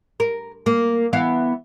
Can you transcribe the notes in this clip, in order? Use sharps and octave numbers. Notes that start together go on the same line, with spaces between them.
A#4
A#3
E3 B3 F5